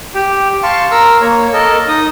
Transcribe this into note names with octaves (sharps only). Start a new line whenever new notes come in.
G4 G5
F5 A5 C6 C#6
A#4 A#5 E6
A#3 C#5
A4 A#4 D#5 A5
D#4 D#5 D#6